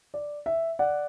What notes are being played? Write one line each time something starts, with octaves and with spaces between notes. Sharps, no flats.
D5
E5
D5 F#5